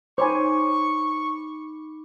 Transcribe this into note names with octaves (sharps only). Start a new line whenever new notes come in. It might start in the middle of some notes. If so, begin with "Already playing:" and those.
D#4 C5 C#5 G#5 B5 C#6 D6